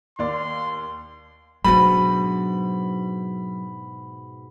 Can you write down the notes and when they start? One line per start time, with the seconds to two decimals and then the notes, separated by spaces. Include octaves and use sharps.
0.19 D#2 D5 C6
1.65 G#2 B2 F#3 D4 B5